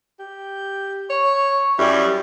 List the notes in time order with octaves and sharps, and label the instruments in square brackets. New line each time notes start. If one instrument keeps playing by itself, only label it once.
[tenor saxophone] G4
[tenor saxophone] C#5 [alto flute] C#6
[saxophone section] F#2 G3 [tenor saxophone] E4